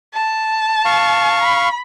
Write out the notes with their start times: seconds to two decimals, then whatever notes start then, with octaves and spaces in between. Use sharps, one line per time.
0.14 A5
0.85 F5 C#6
1.43 B5